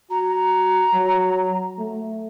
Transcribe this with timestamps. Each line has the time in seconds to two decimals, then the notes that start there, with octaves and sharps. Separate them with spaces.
0.11 F#4 A#5
0.93 F#3
1.79 A3